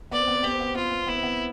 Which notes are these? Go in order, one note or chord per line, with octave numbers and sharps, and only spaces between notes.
B3 D5
C4
B3
C4
B3 G4
C4
B3
C4
B3 F4
C4
B3
C4
B3 E4
C4
B3